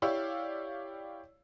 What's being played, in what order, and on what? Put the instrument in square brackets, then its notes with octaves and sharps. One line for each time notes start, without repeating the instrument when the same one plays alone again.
[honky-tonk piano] E4 G4 C#5 D5 F5 E6